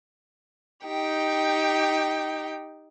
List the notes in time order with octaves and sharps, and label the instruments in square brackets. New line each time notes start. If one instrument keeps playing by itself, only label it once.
[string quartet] D#4 G4 G5